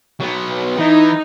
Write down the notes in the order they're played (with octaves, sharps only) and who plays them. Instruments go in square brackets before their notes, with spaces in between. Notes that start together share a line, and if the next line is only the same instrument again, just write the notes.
[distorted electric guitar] F#3 B3
[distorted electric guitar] E3 [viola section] D#4